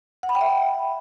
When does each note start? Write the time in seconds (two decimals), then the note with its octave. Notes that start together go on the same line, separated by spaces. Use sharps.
0.23 F#5
0.29 B5
0.35 G5
0.41 E5